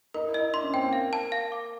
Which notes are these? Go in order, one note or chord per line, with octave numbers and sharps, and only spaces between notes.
D#4 A#4
E4
D#5
D#4
D4 C6
C#4
C4 G5
A#3
F5
A5
F5
D6